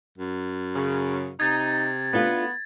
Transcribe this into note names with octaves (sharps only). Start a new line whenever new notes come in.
F#2
C#3
C3 D#4 G#6 A6
A3 B3 D4 F4